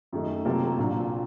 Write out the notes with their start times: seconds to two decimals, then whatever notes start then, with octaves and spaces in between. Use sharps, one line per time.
0.13 F#2 D#3 A3 D#4
0.45 C3 F#3 A#3 F4 A4
0.78 A#1 A#2 F#3